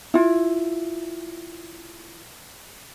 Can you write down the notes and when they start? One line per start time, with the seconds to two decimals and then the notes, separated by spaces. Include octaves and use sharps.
0.14 E4 F4